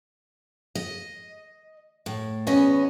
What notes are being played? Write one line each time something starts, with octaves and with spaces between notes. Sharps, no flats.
D#5
A2
E2 B3 C#4 D#5